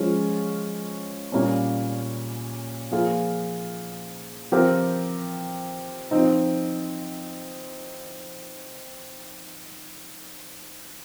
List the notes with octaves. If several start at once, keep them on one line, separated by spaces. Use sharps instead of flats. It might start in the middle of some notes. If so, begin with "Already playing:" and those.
Already playing: F3 G#3 C#4 F4
A#2 G3 A#3 C#4
F3 A#3 F4 G#4
F3 C4 G4 A#4
F3 C4 D#4